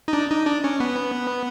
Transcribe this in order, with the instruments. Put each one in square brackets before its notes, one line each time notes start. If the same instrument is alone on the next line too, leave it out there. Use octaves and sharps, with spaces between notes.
[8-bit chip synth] D#4
D4
D#4
D4
C#4
B3